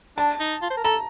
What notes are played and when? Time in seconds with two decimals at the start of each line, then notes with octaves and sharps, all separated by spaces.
0.17 D4 A5
0.40 D#4
0.62 F4
0.70 C5
0.77 A#4
0.84 A4 A#5